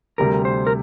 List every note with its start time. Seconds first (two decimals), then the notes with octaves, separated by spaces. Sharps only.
0.18 D2 C3 G3 A#4
0.45 C5
0.67 A#4